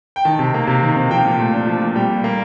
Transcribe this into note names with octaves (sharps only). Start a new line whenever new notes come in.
G5
D#3 A5
C3
A#3
C3
D#3
C3
F3 G5
A#2
A3
D4
F3
A#2
G3 G5
A#2
A#3